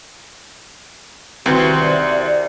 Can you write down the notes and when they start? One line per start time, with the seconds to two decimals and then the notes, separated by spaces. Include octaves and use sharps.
1.46 C2 D#3 C4 F#4 B4 C#7
1.81 C5 D5 E5